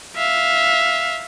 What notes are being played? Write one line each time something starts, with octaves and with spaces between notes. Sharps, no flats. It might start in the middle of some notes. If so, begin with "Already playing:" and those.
E5 F5